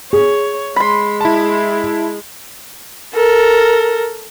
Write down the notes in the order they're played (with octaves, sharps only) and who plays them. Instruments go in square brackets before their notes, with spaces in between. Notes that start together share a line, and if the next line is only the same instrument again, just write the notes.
[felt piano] G#4 [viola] C#5
[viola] G#3 [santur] B5 C6
[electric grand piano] E4 A5
[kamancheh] A4 A#4